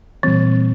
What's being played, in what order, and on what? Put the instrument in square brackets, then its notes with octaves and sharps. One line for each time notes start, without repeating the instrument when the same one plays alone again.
[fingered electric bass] A#2 G3 C4 [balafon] E3